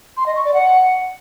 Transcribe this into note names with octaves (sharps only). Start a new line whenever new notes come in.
C6
D#5
C#6
D5
F#5